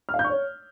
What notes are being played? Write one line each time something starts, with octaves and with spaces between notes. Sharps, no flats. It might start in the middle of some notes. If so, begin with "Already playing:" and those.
F6
F5
G6
C#6
C#5